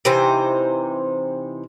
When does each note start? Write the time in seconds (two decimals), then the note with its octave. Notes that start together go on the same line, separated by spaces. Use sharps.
0.05 C3 E3 D#4 C5